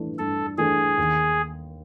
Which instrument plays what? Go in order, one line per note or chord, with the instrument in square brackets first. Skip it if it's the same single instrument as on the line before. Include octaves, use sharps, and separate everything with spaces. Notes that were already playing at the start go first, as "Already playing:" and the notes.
Already playing: [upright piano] G2 E3 A3 D4
[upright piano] G2 [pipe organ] A4
[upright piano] E3 A3 D4 [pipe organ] G#4
[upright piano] D#2